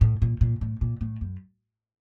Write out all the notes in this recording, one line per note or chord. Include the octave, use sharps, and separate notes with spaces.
A2
A#2
A#2
A2
A#2
A2
F#2